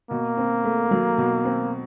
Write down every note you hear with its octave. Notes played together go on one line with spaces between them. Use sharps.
B2 A#3
C4
A3
F#3
B2
C4